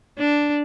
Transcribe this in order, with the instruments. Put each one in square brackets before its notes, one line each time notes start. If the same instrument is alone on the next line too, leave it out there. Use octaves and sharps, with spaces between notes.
[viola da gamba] D4